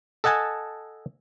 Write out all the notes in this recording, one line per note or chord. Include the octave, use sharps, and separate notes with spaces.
A4 D#5 F#5 G#5 A5